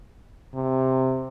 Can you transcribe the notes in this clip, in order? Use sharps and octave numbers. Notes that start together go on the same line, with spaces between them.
C3